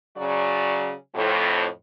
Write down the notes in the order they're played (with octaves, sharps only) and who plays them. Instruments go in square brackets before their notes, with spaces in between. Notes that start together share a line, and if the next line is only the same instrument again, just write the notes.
[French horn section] C#3 F#3 D5
F2 A2